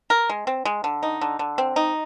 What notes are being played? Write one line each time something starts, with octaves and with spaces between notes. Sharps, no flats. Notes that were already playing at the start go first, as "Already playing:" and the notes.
A#4
G#3
C4
G#3
D3
D#4
D3
D3
C4
D#4